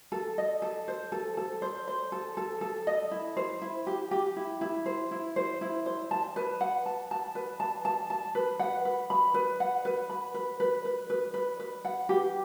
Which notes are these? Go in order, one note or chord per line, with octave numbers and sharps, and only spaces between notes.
A4
D#5
A4
C5
A4
A4
C5
C5
A4
A4
A4
D#5
E4
C5
E4
G4
G4
E4
E4
C5
E4
C5
E4
C5
A5
B4
F#5
A5
A5
B4
A5
A5
A5
B4
F#5
B4
B5
B4
F#5
B4
B5
B4
B4
B4
B4
B4
B4
F#5
G4